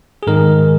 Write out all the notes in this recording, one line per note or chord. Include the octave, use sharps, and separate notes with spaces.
G#4
G#2 D#3 G#3 A#4